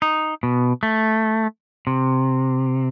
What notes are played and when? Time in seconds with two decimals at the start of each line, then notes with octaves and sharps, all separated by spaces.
0.02 D#4
0.43 B2
0.83 A3
1.87 C3